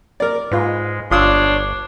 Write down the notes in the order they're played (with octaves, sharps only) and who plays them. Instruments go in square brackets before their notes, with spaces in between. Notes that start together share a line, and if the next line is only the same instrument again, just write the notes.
[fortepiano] A#4 D5
[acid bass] G#2 [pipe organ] G#3 [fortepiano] F4 B4
[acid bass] G1 [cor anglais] D4 [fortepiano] F4 D#6 E6 [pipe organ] C#5 C6